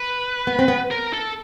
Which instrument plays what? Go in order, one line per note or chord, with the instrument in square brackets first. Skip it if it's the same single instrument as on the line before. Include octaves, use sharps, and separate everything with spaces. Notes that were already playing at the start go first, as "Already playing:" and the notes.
Already playing: [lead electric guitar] B4
[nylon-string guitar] B3
C4
B3
[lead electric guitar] A#4
A4